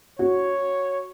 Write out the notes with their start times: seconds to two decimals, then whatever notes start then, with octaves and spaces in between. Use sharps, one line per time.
0.19 F#4 C#5